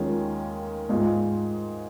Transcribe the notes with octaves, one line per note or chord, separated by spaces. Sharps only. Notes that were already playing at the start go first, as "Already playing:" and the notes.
Already playing: D#2 D#3 G#3 C#4 F4
G#2 G#3 F4